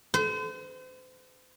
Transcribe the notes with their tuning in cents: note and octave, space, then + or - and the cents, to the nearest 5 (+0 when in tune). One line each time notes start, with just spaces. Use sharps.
C5 -40